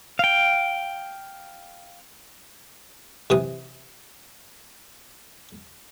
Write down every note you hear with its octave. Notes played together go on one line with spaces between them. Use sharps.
F5 G5
C3 E3 D#6